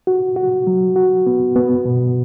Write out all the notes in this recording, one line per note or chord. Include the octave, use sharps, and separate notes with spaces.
F#4
F#4
F#3
F#4
B3
B3
B2